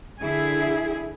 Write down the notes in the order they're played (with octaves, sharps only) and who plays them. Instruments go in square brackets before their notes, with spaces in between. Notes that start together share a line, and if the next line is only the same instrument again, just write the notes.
[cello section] D3 E4 [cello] G#4